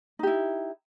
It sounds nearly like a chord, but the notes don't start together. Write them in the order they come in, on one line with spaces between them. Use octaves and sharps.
D#4 G4 E4